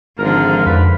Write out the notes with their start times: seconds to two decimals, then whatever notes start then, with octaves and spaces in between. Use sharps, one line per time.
0.19 G#1 D3 F3 A#4
0.66 F2 B4